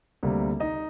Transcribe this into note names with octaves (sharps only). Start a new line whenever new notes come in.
D2 C3 G3 A#3
D#4 D#5